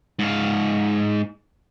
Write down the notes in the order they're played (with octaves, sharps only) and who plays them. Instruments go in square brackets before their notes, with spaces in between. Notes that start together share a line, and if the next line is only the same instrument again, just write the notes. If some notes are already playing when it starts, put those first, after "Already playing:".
[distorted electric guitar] G#2 F5